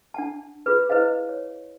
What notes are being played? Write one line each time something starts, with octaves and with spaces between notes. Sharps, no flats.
D4 F#5 A5
F4 G#4 B4
E4 B4 C5 D#5 F5
C#5